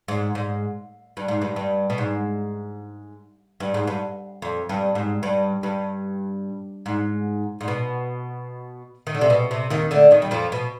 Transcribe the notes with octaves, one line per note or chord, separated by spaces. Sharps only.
G#2
G#2
G2
G#2
G2
G2
B2
G#2
G2
G#2
G2
F2
G2
G#2
G2
G2
G#2
G#2
B2
D#3
D3
C3
B2
C3
D#2 D#3
D2 D3
D#2 D#3
G3
F2 F3
B2